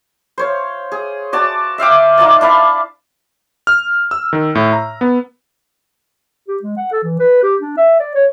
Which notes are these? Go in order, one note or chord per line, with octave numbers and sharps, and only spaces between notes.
C5 C#5 F5
G#4
F#4 D5 A5
E5 F5 G5 D6
D#4 F4 D5 A5
D4 E4 F5 B5
F6
E6
D#3
A2
A#5
B3
G4
G#3
F#5
A4
E3
B4
G4
D4
E5
D5
C#5